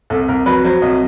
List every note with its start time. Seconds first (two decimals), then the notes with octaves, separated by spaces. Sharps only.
0.10 C2 A4
0.28 C2 A#4
0.46 F#3 B4
0.65 F#3 C5
0.82 C2 D#5